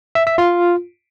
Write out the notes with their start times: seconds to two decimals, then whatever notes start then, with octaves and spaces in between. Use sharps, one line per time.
0.15 E5
0.27 E5
0.38 F4